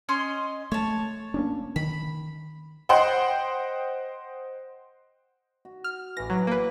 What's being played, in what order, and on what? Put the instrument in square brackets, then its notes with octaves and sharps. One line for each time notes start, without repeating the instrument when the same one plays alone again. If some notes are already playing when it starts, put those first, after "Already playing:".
[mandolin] C#4 D#5 C6
[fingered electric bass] A3 [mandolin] C#5 A5
[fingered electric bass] A#3 C#4 D4
[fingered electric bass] D#3 [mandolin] B5
[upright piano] C5 D#5 F#5 G5 C6
[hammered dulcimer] F#4
[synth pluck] F6
[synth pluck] A1 A#6 [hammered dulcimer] E3 D6
[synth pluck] F#3
A#3 B4